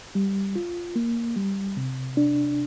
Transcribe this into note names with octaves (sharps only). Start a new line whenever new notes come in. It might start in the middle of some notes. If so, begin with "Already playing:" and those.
G3
F4
A#3
G3
C3
D4